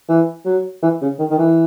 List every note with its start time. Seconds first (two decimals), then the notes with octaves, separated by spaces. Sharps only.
0.09 E3
0.45 F#3
0.82 E3
1.01 C#3
1.19 D#3
1.30 D#3
1.38 E3